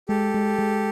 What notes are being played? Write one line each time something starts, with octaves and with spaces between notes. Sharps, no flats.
G#3 G4 A4
G#3
G#3